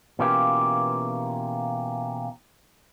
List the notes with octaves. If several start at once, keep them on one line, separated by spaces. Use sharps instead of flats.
B2 E3 A#3 C#4 F4 G4